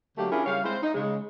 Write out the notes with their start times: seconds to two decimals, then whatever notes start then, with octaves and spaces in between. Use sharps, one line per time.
0.18 D3 F#3 A3 A#3 G4
0.32 C#4 D4 E4 F4 G#4 A#4
0.46 C#3 G3 C#5 F5
0.64 G#3 C4 E4 C5
0.82 D#4
0.94 C#3 G#3